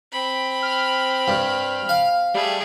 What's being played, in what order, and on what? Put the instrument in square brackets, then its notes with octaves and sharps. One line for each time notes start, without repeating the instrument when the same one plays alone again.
[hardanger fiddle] C4 B5
[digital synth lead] F6
[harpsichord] G2
F5
[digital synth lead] G3 [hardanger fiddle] A3 G#4